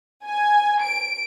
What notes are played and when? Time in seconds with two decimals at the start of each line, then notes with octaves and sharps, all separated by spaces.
0.24 G#5
0.82 D7